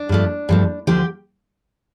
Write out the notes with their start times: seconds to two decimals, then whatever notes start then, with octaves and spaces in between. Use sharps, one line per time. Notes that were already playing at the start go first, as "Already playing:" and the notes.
Already playing: D4
0.09 G2 F3 A3
0.49 G2 F3 A3
0.87 D2 D3 F3 G4